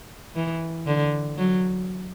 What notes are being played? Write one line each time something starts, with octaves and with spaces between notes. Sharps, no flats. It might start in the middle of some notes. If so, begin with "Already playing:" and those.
E3
D3
F#3